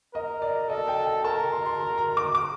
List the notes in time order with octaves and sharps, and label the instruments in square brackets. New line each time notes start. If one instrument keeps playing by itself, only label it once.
[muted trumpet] A#4 [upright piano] D#5
[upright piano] D5
[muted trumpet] A4 [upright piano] D#5
[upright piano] G5
G5
[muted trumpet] A#4 [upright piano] A5
[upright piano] A#5
C6
C6
C6
A#5
D6
D6